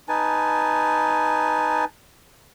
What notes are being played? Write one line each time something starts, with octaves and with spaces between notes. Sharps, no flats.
D#4 B4 G#5 A5